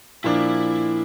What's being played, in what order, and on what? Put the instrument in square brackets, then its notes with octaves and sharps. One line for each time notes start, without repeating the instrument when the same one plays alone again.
[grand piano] A#2 F3 A#3 D4 [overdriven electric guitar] E4